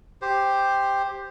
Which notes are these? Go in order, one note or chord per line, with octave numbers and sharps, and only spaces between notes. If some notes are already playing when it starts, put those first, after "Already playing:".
G4 C5